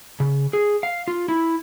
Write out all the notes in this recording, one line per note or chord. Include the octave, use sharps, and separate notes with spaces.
C#3
G#4
F5
F4
E4